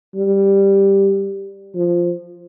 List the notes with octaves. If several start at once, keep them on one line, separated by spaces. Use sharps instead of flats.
G3
F3